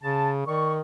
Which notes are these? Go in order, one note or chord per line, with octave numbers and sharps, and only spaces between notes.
C#3 A5
D#3 D5 C#6